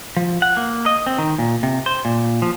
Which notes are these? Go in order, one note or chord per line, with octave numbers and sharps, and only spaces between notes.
F3
F#5
A#3
D#5
C4
D#3
A#2
C3
C5
A#2
F3